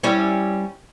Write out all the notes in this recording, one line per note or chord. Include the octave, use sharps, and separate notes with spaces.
G3 C#4 E4